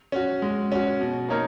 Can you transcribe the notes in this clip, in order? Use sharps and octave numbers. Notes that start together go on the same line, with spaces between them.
C#4 F#4
G#3
C#4 F#4
B2
A#3 D#4 A#4 C#5